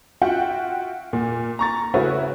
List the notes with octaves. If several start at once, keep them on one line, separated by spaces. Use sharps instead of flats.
F4 F#4 E5 F#5 G5
A#2
A#5 C#6 A6
C#3 A3 C#4 E4 F#4 B4